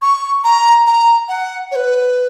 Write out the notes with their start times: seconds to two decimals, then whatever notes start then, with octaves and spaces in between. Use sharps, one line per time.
0.02 C#6
0.44 A#5
0.86 A#5
1.29 F#5
1.71 C#5
1.76 B4